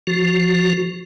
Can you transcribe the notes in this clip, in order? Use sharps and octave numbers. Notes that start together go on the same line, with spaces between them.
F3 F#4